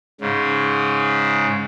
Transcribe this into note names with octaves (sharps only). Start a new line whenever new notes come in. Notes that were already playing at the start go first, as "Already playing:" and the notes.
G#2 C#3